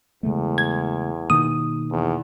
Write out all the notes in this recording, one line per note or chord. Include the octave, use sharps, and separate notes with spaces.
E2 C#3 G#3 A3
G#6
B2 D#3 A#3 D#6
E2